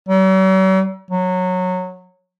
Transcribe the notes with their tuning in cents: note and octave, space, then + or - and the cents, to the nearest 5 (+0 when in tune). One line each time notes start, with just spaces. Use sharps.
F#3 +45
F#3 -15